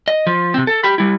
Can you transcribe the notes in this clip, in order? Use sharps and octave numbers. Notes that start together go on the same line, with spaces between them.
D#5
F3
C3 C4
A4
G4 B5
G3 E4